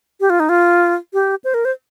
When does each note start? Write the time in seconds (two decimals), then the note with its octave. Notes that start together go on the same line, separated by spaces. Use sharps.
0.20 G4
0.30 F4
0.40 D#4
0.49 F4
1.13 G4
1.44 C5
1.54 A#4
1.65 C5